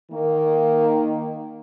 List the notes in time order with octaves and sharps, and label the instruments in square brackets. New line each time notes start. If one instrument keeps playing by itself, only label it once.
[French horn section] D#3 A#3